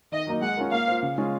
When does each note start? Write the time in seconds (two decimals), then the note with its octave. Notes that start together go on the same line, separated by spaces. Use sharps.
0.12 D#3 D#5
0.27 F#3 A#3 D#4
0.42 G#3 F#5
0.57 C#4 F4 A#4
0.71 A#3 F5
0.88 F4 C5
1.03 C#3
1.18 G#3 C#4 F4